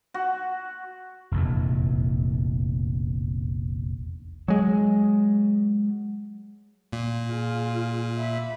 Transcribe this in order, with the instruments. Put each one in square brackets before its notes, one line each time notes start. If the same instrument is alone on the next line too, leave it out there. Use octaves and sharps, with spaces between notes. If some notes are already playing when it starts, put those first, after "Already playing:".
[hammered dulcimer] F#4
[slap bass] F1 A#1 E2
[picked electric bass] F#3 G#3
[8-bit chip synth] A#2
[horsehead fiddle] F4 G#4
E5 B5